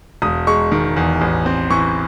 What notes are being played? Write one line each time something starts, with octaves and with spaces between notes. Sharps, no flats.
E1 D#6
G#3 C#6
D#3
E2
A1
C4
E3 C#6